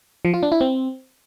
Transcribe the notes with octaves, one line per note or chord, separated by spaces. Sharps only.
F3
F4
D4
E4
C4